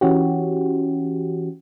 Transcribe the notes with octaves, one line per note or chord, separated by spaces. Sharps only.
E3 C#4 F#4 G4